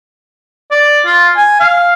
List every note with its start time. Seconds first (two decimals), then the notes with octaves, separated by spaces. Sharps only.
0.71 D5
1.06 F4
1.37 G#5
1.60 F5